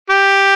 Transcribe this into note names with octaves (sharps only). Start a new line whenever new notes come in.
G4